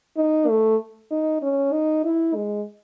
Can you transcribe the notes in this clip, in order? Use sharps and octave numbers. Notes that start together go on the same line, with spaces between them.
D#4
A3
D#4
C#4
D#4
E4
G#3